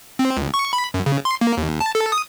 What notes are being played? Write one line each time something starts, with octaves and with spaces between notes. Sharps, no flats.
C4
C#2
C#6
B5
F#2
C#3
C6
A#3
D#2
A5
A4
D#6